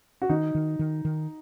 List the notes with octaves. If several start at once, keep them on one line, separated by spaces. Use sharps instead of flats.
F#4
D#3 D#4
D#3
D#3
D#3